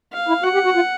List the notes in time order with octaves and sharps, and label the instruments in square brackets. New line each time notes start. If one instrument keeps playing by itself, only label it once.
[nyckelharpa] F5
[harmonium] E4
[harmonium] F#4 [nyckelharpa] F#5
[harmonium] G4
F#4
F4